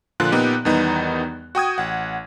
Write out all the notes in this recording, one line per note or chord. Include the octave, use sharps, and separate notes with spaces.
A#2 D3 F3 F4 F#6
A#2 B3 D#4 G4
E2 D#3 G3 B3 D#4
F#4 G5 D#6 G#6
A1 F#5